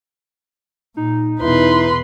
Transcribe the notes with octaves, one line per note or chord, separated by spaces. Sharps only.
A#2 D#4
E2 B2 E4 B4 C6